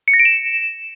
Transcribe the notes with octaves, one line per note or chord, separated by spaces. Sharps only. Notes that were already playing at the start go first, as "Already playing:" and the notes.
C#7
A#6
D7
E7